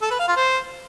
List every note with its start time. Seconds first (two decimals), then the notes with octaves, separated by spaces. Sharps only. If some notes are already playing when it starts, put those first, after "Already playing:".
0.02 A4
0.10 B4
0.19 F5
0.28 F4
0.36 C5